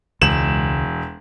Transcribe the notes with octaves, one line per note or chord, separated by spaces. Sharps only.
E1 C#2 E7 F#7